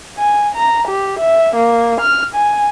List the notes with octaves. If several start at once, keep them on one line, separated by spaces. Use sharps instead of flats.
G#5
A#5
G4
E5
A#3
F6
G#5